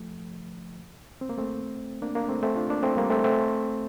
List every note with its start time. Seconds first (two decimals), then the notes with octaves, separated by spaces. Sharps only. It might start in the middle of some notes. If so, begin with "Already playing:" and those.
Already playing: F3 A3
1.21 C4
1.29 A#3
1.37 A3 C4
2.02 A#3 D4
2.15 A#3 D4
2.29 A3 C4
2.43 A3 C4
2.56 D4 F4
2.70 A#3 D4
2.83 A3 C4
2.97 G3 A#3
3.10 A3 C4
3.24 A3 C4